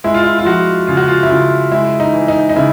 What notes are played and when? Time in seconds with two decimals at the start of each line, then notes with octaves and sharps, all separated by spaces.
0.04 G#3 E4
0.14 F4
0.24 E4
0.39 F4
0.45 F3 F#4
0.87 C#3 F4
0.97 F#4
1.08 F4
1.23 E4
1.30 C#3 F4
1.71 G#3 E4
2.00 D#4
2.14 E3
2.28 D#4
2.49 D#4
2.56 C#3 E4